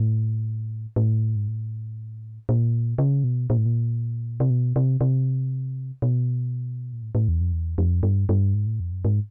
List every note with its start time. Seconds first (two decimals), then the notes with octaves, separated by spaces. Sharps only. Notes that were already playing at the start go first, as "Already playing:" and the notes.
Already playing: A2
0.96 A2
1.36 G#2
1.48 A2
2.49 A#2
2.98 C#3
3.24 B2
3.50 A#2
3.57 A2
3.66 A#2
4.40 C3
4.50 B2
4.76 C3
5.01 C3
6.02 B2
6.93 A#2
7.03 A2
7.15 A2
7.28 E2
7.41 F2
7.53 E2
7.78 F2
8.03 G2
8.29 G2
8.54 G#2
8.67 A2
8.80 F2
8.92 F#2
9.05 G#2